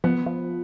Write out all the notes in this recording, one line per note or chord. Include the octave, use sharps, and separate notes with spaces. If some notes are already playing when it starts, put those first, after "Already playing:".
F3 B3
F3